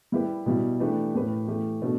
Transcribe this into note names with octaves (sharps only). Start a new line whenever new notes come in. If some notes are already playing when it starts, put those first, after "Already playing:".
G3 E4 G4 B4
B2 G3 E4
E3 A3 D4 G4 B4
A2 A3 G4 B4
E3 A3 G4
B2 A3 D4 B4